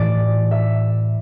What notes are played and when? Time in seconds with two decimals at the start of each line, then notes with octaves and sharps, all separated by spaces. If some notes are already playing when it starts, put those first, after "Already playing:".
Already playing: A2 E3 D5
0.51 E5